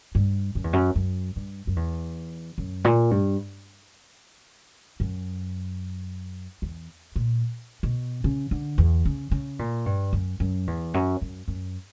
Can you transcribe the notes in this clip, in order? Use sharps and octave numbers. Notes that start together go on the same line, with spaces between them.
G2
F#2
E2
F#2
F#2
G2
F#2
E2
F#2
A#2
G2
F#2
E2
A#2
B2
C#3
D3
E2
C#3
C#3
A#2
G2
F#2
F#2
E2
F#2
F#2
F#2